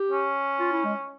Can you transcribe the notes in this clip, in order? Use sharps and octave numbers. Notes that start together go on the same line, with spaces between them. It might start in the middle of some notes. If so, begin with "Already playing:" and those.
Already playing: G4
C#4
F4
E4
G#3